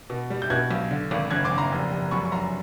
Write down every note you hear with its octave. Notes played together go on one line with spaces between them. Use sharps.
B2
G3
G6
B2 F#6 G#6
B1
D3
G#1
F#1 F#6 G#6
C6 D6
F#1
A#5 C6
F1
F1
F#2 B5 C#6
C#6
F#2 A#5 C6